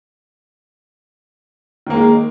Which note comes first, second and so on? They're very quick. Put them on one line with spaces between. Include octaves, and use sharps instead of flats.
D#3 A#3 G#3